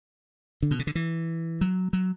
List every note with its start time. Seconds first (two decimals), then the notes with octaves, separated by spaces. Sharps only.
0.63 D3
0.71 B2
0.79 C#3
0.87 D3
0.95 E3
1.61 F#3
1.93 F#3